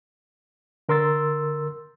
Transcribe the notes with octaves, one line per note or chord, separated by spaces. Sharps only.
D3 A#4 C6 E6 A6